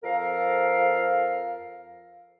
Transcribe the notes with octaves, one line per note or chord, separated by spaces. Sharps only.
F2 F3 A4 A#4 F5